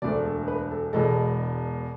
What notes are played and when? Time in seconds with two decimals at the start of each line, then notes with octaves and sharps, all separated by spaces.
0.02 E1 D2 D3 A3 D5
0.25 A4
0.48 B4
0.71 A4
0.93 E1 E2 B2 G#3 A4